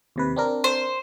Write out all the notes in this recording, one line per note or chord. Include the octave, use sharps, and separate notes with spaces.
D#2 C3 B4
C4 D4 A#4
C5